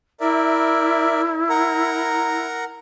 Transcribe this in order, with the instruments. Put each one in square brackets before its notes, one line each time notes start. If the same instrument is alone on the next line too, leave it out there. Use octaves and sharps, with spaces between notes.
[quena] E4 [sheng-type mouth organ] A#4 D5 E5
[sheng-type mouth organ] A#4 F#5 A#5